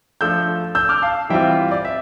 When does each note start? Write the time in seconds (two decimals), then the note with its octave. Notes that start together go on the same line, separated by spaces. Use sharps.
0.21 F3 A3 D4 E6 G6
0.75 E6 G6
0.89 D6 F6
1.02 F5 A5
1.30 E3 G3 C4 F4 E5 G5
1.71 D5
1.85 E5